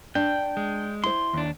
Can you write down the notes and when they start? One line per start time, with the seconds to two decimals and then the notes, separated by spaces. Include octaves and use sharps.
0.15 D4 G5
0.57 G#3
1.04 E4 C5 C6
1.33 D#2 D4